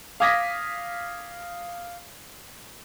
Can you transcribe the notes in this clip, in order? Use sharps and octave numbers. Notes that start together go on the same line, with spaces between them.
F5 D6 D#6 G#6 A#6 B6